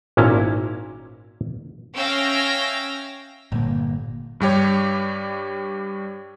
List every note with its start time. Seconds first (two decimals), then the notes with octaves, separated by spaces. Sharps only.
0.17 G#1 A#2 C#4 E4 A5 A#5
1.95 C#4 E5 F5 G5 E6 A#6
3.52 G1 A#2 A#3
4.40 G2 G3 G4 C#5